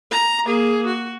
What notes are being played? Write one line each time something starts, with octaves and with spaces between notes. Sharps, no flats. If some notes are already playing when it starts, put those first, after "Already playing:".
A#5
A#3 G#4
F#4